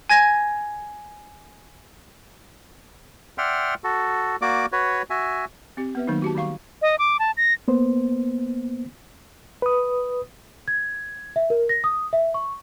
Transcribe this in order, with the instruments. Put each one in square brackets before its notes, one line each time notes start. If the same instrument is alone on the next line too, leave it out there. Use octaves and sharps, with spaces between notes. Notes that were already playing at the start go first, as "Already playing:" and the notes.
[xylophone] G#5 G#6 A#6
[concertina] D5 E5 F#5 G5 C6 F6
F#4 A4
A#3 F#4 D5 D6
F#4 B4 C#5
F#4 E5 G#5
[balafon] C4 G4
B3 B4 E5
D#3 F#3 A3 A#3 D#4
F#4 G4 A5
D#3 G3 F5 C#6
[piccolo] D#5
D6
A5
A#6
[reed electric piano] A#3 B3 C5
B4 D#6
[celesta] G#6
E5
A#4
A#6
D#6
E5
C#6